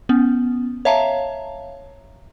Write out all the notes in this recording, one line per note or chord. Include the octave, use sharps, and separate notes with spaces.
B3 C#4
C#5 E5 F5 A5 A#5